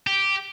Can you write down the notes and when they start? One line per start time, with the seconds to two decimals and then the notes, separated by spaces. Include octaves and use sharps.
0.07 G4